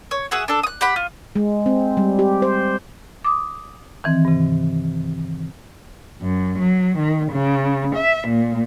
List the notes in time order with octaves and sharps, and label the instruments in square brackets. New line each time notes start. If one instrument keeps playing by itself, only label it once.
[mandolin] C#5
F#4 G#4 E5 F#5
D4 A4
D#6 F#6
G4 F#5 B5
F4
[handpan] G#3
C4
G3
G4
C5
[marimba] D6 D#6
D#3 E3 C4
G2 C3
[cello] F#2
F#3
D#3
C#3
E5
A#2